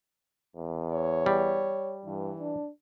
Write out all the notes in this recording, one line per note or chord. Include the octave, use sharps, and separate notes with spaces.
E2
C#5
G3
G2 E3
D4